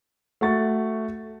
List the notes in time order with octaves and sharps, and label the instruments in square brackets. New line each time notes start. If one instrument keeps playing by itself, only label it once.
[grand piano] A3 F#4 F#5 C#6 A6